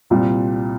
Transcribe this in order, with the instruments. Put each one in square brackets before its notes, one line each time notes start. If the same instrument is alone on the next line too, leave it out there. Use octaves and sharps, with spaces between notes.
[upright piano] C2 A#2 G3